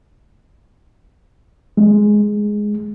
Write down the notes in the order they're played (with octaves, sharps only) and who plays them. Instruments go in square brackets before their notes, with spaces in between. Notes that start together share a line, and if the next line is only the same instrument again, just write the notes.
[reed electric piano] G#3